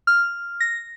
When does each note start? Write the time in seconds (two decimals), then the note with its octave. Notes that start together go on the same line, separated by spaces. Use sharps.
0.07 F6
0.60 A#6